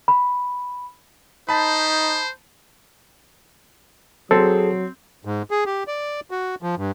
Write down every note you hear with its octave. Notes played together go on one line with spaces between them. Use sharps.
B5
D#4 C5 A5 B5
F#3 C4 G#4 A4
G#2
G#4
G4
D5
F#4
F3
G2